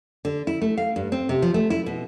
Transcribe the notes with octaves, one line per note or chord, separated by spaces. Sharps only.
D3
E4
A3
F5
G2
C4
C3
F3
A3
E4
B2